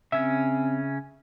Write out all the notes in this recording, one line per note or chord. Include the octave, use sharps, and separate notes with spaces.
C#3 C4 C#4 E5